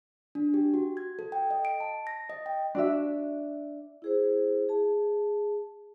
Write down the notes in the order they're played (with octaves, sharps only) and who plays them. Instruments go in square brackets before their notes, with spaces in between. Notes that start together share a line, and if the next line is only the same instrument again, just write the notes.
[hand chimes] D4
G4
F#4
G#6
A4
G5
D#5
D7
A5
A#6
D#5
G5
[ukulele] D4 F#4 E5
[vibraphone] E4 G#4 C5
G#4 A5